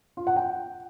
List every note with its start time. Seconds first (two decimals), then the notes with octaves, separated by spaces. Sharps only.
0.17 F4
0.27 F#5
0.36 G5